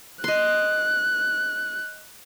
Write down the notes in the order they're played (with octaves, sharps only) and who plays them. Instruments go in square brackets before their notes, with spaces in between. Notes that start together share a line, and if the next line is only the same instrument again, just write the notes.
[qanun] D#5 C6 [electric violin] F#6